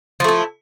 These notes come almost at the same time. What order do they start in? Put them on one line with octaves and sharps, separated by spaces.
F3 A3 E4